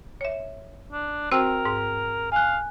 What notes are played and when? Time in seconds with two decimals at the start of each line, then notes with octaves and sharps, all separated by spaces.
0.21 C#5 E5
0.92 D4
1.32 C4 F#4 A#4 C5 G5 E6
1.65 G#2
2.32 F5 G#5 F#6